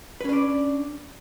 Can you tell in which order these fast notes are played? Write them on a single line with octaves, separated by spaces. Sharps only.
B4 C#4 D4 D5